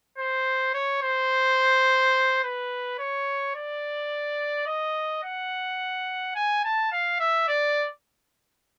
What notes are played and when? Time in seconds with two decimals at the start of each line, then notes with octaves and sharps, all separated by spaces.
0.18 C5
0.74 C#5
1.02 C5
2.43 B4
2.99 C#5
3.55 D5
4.67 D#5
5.24 F#5
6.35 G#5
6.65 A5
6.92 F5
7.20 E5
7.48 D5